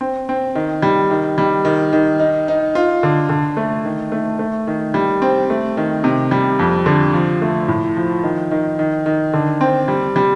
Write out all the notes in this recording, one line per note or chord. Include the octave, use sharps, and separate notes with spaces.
C4
C4
D#3
G3
D#3
G3
D#3
D#3
D#4
D#4
F4
D3
D3
A3
D#3
A3
A3
D#3
G3
C4
A3
D#3
C3
G3
F2
D3
F3
A3
A2
F3
D#3
D#3
D#3
D#3
D3
C4
G3
G3